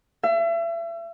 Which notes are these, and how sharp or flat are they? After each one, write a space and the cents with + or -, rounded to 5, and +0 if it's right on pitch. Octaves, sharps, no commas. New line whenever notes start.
E5 +35